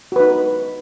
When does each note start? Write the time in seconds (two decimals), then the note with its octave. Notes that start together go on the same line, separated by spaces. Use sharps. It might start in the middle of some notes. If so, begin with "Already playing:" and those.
0.12 F#4
0.16 B4
0.20 D#4